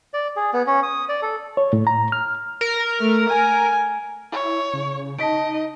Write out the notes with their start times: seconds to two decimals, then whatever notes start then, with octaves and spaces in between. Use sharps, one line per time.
0.14 D5
0.36 G#4
0.54 B3
0.67 C#4
0.83 D#6
1.09 D5
1.22 A4
1.57 C#5
1.73 A2
1.87 A#5
2.12 F6
2.61 A#4
3.00 A3
3.28 G#5
4.32 E4 C#5
4.74 C#3
5.19 D#4 D#5 A5 B6 D7